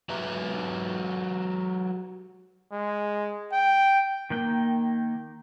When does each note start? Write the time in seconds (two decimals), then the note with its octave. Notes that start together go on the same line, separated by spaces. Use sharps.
0.09 F#3 G4 B4 E5 A#5
2.73 G#3
3.53 G5
4.30 D#3 A#3 G5